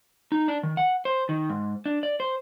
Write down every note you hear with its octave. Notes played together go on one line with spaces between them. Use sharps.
D#4
D4
D#3
F#5
C5
D#3
G#2
D4
D5
C5